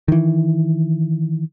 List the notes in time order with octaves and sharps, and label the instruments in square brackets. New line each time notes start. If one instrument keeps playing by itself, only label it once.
[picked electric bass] D#3 E3